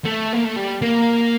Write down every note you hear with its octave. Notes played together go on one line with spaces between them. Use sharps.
A3
A#3
A3
G3
A#3